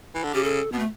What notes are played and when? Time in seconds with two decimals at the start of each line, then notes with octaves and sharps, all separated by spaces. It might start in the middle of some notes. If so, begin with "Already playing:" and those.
0.15 E3
0.24 D3
0.34 C#3 G4
0.44 A4
0.72 B2 B3
0.79 A3